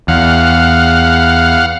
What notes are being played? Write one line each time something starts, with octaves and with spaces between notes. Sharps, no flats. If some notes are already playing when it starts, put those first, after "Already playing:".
E2 F5 F#5